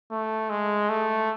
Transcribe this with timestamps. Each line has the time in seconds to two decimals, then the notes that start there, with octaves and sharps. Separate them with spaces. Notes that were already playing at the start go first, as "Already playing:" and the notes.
0.11 A3
0.50 G#3
0.90 A3